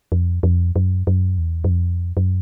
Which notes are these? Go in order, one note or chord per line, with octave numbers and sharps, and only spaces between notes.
F2
F2
F#2
F#2
E2
F#2
F2
F#2